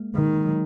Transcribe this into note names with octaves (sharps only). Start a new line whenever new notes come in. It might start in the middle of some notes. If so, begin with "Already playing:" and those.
Already playing: G#3 A#3
D#3 G#3
F#3